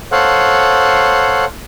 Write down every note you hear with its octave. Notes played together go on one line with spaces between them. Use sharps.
A4 C5 C#5 F5 F#5